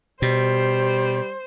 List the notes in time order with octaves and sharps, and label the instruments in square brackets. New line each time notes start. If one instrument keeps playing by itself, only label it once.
[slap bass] B2 [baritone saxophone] G3 [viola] C5